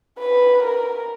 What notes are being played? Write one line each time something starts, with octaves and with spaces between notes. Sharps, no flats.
B4
A#4